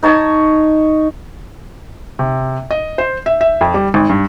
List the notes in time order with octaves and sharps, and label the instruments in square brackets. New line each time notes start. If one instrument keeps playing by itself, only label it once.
[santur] D#4 C#5 A5 D#6
[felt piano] C3
D#5
C5
E5
E5
F2
G3
G#1
G2